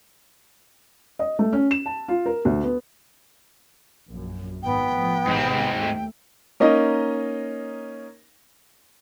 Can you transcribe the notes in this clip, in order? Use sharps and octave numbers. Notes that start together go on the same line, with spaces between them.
D#5
A3
C#4
E7
A5
F4
A#4
D2
B3
A#1 F#2
G#1 B3 G5
A2 F3
A1 G#2 C3 C4
D#2 A3
A#3 C#4 D#4 D#5